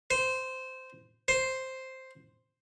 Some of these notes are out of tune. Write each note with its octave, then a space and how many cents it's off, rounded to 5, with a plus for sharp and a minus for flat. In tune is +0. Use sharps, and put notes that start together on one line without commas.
C5 -15
C5 +0